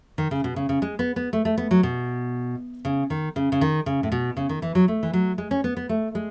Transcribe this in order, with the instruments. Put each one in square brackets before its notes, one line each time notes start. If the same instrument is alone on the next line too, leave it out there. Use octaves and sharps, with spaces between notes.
[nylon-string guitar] D#3
C#3
B2
C#3
C#3
G#3
B3
B3
A3
A3
B3
F#3
B2
C#3
D#3
C#3
C#3
D#3
C#3
A2
B2
C#3
D#3
E3
F#3
A3
E3
F#3
G#3
C#4
B3
B3
A3
G#3